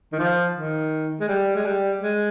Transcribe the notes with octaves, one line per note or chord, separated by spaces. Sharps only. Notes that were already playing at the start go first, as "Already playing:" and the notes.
D#3
F3
D#3
G#3
G3
G#3
G3
G#3